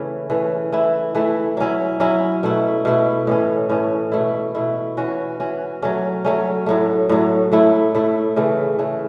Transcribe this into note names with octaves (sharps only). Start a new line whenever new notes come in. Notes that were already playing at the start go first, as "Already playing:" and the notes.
Already playing: C#3 E3 A3 C#4
E3 A3 C#4
E3 A3 E4
E3 A3 E4
F#3 C#4 E4
F#3 C#4 E4
B2 A3 E4
B2 A3 E4
A2 E3 C#4
A2 E3 C#4
B2 A3 E4
B2 A3 E4
E3 C#4 F#4
E3 C#4 F#4
F#3 A3 C#4
F#3 A3 C#4
A2 F#3 A3
A2 F#3 A3
A2 A3 E4
A2 A3 E4
C#3 E3 A3
C#3 E3 A3